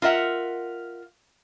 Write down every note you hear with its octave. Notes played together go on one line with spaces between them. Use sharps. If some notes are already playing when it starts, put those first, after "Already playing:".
F4 A#4 E5 F#5